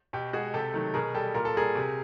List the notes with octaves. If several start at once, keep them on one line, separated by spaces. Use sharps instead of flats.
B2 G4
G#3 F#4 G#4
C3 G4 A4
D#3 F#3 A3
B2 G#4 A#4
G3 G4 A4
A#2 A#4
A4
G3 G#4 A#4
C3